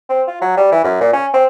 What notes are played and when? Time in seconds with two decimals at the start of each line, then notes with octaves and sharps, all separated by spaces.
0.09 C4
0.28 F4
0.41 F#3
0.57 G3
0.72 E3
0.84 F#2
1.01 A#2
1.13 C#4
1.34 C4